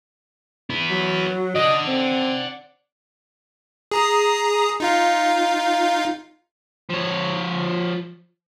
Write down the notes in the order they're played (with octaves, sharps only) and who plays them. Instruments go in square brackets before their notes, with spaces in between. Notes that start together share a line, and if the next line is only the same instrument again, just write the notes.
[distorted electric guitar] B3 E4
[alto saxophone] F#3
[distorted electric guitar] D5 F#5 [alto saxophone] D#5
[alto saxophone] C4
[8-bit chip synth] G#4 A#5 D#6
D#4 F4 F5
[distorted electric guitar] F3 C#5